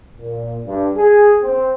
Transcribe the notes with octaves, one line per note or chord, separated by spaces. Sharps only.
A#2
G2
G#4
C4